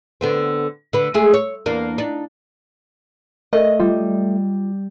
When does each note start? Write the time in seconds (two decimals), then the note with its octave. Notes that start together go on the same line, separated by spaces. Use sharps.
0.21 D3 B3 C4
0.93 D3 B4
1.14 G#3 A3 G#4
1.34 C#5
1.66 E2 A#3 D4
1.98 D4 D#4
3.53 A3 A#4 D#5
3.80 G3 F4